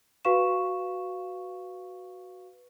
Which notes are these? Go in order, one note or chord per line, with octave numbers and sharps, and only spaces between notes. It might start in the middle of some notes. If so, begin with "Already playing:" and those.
F#4 B4 F5 C#6 E7